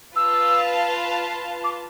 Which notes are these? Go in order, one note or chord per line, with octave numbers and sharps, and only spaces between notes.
F4 B4 F5 A5 E6
D6